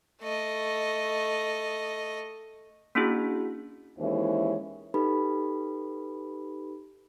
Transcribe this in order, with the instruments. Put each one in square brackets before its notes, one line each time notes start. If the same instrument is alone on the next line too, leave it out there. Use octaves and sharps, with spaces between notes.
[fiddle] A3 D#5
[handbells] A#3 C#4 D4 E4 F#4 G#4
[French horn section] D#2 E3 G#3 C#4 E4 C5
[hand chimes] D#4 G4 A4 B4 B5